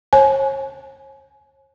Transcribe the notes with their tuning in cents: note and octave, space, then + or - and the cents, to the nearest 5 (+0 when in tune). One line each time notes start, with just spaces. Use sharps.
C#5 -40 G#5 +35